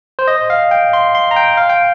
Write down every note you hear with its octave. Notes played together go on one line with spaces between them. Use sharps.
C5
D#5
F5
G5
C6
C6
A#5
G5
F5
G5